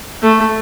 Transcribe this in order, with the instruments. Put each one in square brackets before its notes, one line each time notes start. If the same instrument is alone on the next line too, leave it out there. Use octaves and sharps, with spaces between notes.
[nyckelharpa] A3